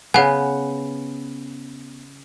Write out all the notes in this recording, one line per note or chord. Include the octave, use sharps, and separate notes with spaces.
C#3 B3 F#5 G#5